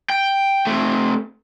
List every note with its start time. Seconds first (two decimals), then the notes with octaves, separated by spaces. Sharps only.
0.10 G5
0.67 A3 C4